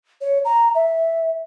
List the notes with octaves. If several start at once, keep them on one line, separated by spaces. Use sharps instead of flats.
C#5
A#5
E5